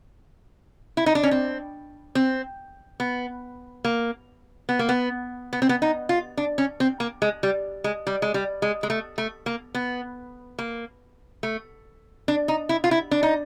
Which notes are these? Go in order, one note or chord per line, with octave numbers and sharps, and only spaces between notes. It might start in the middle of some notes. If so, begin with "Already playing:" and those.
E4
D#4
D4
C#4
C4
C4
B3
A#3
B3
A#3
B3
B3
C4
B3
D#4
F4
D4
C#4
C4
A#3
G#3
G3
G#3
G3
G#3
G3
G#3
G#3
A3
A3
A#3
B3
A#3
A3
D4
D#4
E4
F4
E4
D4
D#4